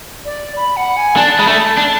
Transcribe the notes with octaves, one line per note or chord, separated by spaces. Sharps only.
D5
B5
F#5
G#5
D4 A5
G#3 B5
A3 A5
D4